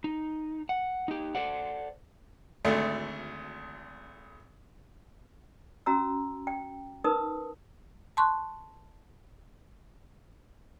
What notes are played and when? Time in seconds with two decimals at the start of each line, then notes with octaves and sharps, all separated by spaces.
0.04 D#4
0.69 F#5
1.08 D#4 G4
1.35 A4 C5 D5 F#5
2.65 G#1 D2 A3
5.86 C#4 F#4 A#5 E6
6.47 G5
7.04 D#4 A#4 B4 D#6
8.17 A5 C6 C#6 F#6